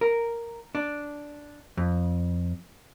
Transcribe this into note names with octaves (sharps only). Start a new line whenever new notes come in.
A#4
D4
F2